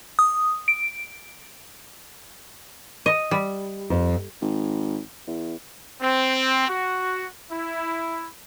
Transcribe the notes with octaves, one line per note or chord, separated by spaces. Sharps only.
D#6
D7
D#5
G3
F2
G#1
E2
C4
F#4
E4